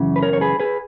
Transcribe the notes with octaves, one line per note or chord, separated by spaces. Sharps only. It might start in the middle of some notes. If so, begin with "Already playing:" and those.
Already playing: F#2 C#3 E3
B4
A#4 C#5
C#5
G#4 B4
G#4 B4